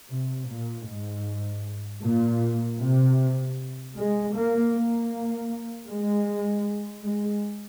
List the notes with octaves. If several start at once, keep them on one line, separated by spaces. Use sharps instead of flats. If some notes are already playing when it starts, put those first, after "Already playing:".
C3
A#2
G#2
A#2
C3
G#3
A#3
A#3
G#3
G#3